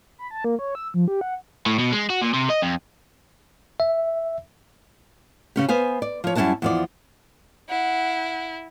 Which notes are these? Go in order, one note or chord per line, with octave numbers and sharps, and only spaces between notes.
B5
A5
A#3
C#5
E6
F3
G4
F#5
A2
B2
G#3
F#4
A#2
C3
D#5
F2
E5
C#3 C#4 G4
B3 C5 F5 G#5
D5
F3 C#5
F#2 G3 C#4 E4 F#4 A5
E2 F3 D5
E4 F#5